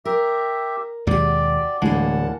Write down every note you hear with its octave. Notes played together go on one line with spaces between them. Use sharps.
G4 A#4 E5
D#2 B2 G#3 F#4 G4 D5
D2 A2 E3 G#3 A#3 F#5 A5